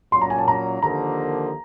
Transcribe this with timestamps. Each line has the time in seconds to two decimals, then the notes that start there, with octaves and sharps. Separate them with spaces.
0.12 A#2 F#3 A#3 C#4 C6
0.22 A#5
0.30 G#5
0.39 A5
0.48 A#5
0.82 D#2 D3 F3 A#3 A#5